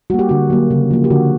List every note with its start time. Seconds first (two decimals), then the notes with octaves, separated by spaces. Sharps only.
0.10 G3 A#3 F#4
0.19 G4
0.29 D3 F#4
0.50 F#3 A#3
0.71 C#3
0.91 F3 A#3
1.04 G4
1.10 D3 F#4